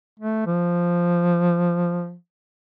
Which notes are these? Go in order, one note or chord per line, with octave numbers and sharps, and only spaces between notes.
A3
F3